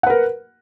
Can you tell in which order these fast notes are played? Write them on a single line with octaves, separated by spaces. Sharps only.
F#5 B4 A#4